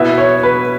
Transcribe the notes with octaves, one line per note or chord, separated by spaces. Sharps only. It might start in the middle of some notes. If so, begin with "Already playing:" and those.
Already playing: B2 B3 E4 E5
C#5
B4